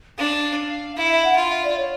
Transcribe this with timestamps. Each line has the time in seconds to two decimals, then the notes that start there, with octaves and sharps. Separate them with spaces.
0.18 D4 F5
0.97 E4 F5
1.11 E5
1.24 F#5
1.36 F4 F5
1.50 E5
1.64 D5
1.76 C#5